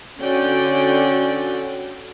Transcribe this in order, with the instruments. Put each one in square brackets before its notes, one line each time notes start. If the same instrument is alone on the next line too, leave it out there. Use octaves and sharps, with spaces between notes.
[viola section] D3 C#4 F#4 D5 G5